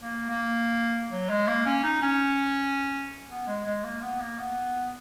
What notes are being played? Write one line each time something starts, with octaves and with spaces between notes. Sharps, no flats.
A#3
A#3
F#3
G#3
A#3
C#4
D#4
C#4
B3
G#3
G#3
A#3
B3
A#3
B3